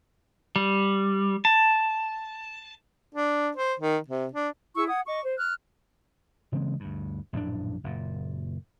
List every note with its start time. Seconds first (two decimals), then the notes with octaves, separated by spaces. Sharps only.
0.56 G3
1.45 A5
3.15 D4
3.57 C5
3.79 D#3
4.08 C3
4.33 D4
4.75 E4 G#4 C#6 E6
4.87 F#5 D#6 G#6
5.07 D#5 C#6 D6
5.23 C5
5.38 F6 F#6
6.52 C#3 E3 G#3 C4
6.80 D2 G2
7.33 A#1 F#2 A2 D4
7.84 F#1 A#2